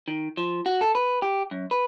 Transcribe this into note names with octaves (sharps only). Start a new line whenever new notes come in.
D#3
F3
F#4
A4
B4
G4
F#2
B4